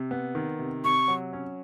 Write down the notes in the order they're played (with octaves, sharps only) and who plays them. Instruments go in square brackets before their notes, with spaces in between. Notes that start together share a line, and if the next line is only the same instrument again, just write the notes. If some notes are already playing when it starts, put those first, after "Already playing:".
Already playing: [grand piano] C3
B3
D#3
C3
[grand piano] C3 [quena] C#6
[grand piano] F#3
C#4